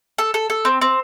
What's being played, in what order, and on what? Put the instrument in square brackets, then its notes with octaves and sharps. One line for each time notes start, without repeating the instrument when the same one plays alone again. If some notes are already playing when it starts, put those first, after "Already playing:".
[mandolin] A4
A4
A4
C4
C4